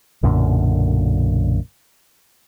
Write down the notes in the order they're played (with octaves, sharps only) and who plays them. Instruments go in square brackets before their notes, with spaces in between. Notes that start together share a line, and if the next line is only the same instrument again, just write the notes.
[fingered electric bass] B1 F#2 A#2 D3